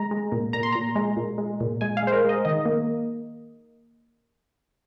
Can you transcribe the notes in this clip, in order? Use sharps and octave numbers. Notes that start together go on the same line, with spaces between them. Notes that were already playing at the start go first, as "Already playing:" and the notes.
Already playing: G#3 A#5
G#3
A#2
A#2 A#5
C6
A#2 A#5
G#3
A#2
G#3
A#2
G#3 G#5
F5
G#3 C5
A#4
G#3 D#5
D#3 D#5
A#3